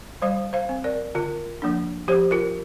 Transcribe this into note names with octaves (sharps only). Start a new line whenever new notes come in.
G3 C5 F5
C5 F5
C4
A#4 D5
D3 F4 A#4
F3 A#3 D4
F3 G4 C5
F4 A#4